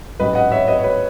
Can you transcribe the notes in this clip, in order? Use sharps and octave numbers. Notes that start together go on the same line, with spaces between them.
A1 G#2 F#3 B4 D#5
D#5 F#5
C#5 E5
B4 D#5
C#5
B4